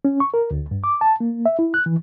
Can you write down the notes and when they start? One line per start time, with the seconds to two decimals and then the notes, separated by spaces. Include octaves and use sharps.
0.05 C#4
0.20 C#6
0.34 A#4
0.51 D2
0.71 G2
0.84 D6
1.01 A5
1.20 A#3
1.46 E5
1.59 E4
1.74 F#6
1.86 E3